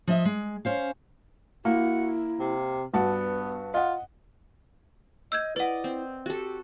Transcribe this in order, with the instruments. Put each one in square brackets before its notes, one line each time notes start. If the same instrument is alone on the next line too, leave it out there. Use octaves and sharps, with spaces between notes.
[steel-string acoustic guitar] F3 D#5 E5
G#3
C#4 C5 F5
[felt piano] A#3 [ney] E4 [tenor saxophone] F#4
[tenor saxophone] C3
[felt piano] G2 F#4 A5 [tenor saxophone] B3 [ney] B4
[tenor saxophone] F4 [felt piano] D#5 F#5
[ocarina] D#5 [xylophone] E6 G6 G#6
[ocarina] E4 [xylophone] B4 F#5 [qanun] D5 D#5
[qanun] C4
[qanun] F#4 A4 [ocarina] G4